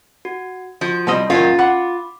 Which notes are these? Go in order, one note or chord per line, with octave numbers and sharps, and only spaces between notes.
F#4
F3 F#4
C2 G3 D#5 A5 C6
F#2 A#2 D#3 C#4 F4
F#5 B5 D6